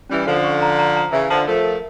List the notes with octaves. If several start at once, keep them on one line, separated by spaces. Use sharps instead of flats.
E3 G3 C#4
D3 F3 A4
C#6
A#5
A#5
A#5
C#3 E3 E5
D3 F3 A5
F3 A3 A#4
A#4